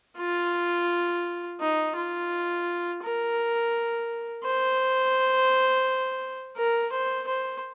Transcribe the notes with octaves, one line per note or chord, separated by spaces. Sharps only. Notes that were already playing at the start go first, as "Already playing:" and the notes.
F4
D#4
F4
A#4
C5
A#4
C5
C5